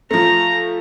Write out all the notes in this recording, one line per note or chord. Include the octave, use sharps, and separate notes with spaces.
F3 A3 A#5